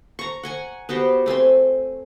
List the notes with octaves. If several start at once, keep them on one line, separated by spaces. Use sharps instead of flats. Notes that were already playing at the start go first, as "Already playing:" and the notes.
A#5 C#6
F#5 G#5 C#6
B3 F#4 G4 C5
A3 C4 G#5 C6